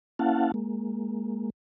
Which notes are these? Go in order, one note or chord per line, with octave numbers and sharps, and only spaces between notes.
A#3 C#4 E4 F5 F#5 A5
G#3 A#3